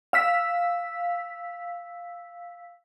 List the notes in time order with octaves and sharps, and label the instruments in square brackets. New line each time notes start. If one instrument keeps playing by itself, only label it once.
[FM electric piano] F5 E6 B6